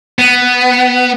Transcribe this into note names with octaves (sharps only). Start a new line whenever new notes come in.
B3